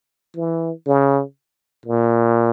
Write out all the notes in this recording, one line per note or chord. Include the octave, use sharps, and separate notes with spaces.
E3
C#3
A#2